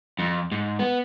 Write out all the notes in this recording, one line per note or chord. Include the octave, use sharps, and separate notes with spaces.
F2
G#2
B3